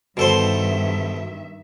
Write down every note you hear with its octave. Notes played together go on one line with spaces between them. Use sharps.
G2 B2 D#3 A4 C5 E5